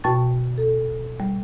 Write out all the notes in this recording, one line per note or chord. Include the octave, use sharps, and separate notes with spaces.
B2 F#4 G5 A5 C#6 A6
A4
G3